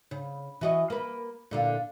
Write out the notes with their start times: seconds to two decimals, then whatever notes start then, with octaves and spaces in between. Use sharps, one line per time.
0.11 C#3
0.61 E3 F#4 D#5
0.90 A#3 B4
1.51 A#2 D3 F4